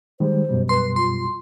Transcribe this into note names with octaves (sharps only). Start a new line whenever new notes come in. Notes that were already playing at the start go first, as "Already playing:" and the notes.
D#3 G3 G#3 C5
F#2 B2 G3
B4 C6
F4 C6